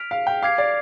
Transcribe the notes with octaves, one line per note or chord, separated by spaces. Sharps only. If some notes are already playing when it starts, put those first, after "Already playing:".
Already playing: F6 B6 D7 F7
F5
G5
F5 D6 G#6 C7
D5